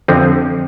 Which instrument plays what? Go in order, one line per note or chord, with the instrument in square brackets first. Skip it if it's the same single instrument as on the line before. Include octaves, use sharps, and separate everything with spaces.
[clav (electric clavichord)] F2 D3 F3 C4